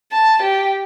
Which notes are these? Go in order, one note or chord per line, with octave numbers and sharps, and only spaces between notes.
A5
G4